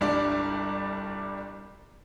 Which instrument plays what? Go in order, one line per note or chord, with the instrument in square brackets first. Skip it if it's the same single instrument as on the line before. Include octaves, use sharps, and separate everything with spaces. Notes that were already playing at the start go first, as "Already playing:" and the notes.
[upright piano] G1 C2 G3 D4 D5